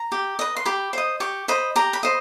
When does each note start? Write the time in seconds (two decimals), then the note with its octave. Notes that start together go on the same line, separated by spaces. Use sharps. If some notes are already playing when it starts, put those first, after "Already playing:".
Already playing: A#5
0.12 G4
0.39 B4 D#5
0.57 C6
0.65 G4 B5
0.93 C5 D#5
1.20 G4 C#6
1.48 C5 D#5 B5
1.76 G4 A#5
1.93 B5
2.03 C5 D#5